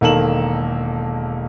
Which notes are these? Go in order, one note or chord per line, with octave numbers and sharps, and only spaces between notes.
E1 D#3 A#3 A4 E7 F#7